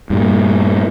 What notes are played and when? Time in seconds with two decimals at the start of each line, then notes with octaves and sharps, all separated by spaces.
0.10 G2 A#2